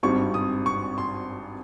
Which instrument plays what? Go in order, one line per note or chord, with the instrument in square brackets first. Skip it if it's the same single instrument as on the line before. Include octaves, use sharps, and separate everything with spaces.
[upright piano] G#1 G2 G3 C4 D#4 C#6
D#6
C#6
C6